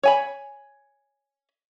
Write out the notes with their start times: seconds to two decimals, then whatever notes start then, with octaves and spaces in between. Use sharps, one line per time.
0.03 C#5 G#5 B5